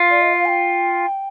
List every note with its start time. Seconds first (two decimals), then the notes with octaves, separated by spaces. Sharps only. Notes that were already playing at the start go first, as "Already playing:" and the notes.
Already playing: F4
0.10 D5
0.21 D#5
0.33 F5
0.45 G#5
0.48 G5